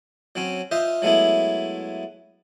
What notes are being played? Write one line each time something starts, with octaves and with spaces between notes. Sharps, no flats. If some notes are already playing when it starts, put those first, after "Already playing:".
F#3 C4 C#4
F4 C5 D#5 E5
F#3 G#3 A3 B3 E4